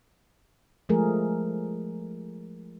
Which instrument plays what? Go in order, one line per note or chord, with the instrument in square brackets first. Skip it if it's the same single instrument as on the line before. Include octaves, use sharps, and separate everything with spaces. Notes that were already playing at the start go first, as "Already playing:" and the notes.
[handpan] F3 G#3 A3 G#4 A#4